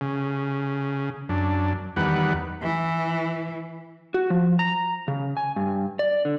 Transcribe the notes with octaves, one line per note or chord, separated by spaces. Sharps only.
C#3
F#2 D4
E2 D#3 G3 B4 F#5
E3
F#4
F3
A#5
C#3
G#5
G2
D5
D3